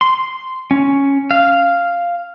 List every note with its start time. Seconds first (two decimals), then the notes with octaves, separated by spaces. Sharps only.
0.01 C6
0.71 C#4
1.31 F5